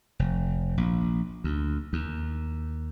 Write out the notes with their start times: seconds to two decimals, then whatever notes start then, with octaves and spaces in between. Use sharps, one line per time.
0.19 F1
0.78 A#1
1.44 D2
1.93 D#2